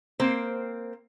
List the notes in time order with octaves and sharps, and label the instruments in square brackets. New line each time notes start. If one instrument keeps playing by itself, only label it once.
[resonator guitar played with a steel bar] A#3 C4 C5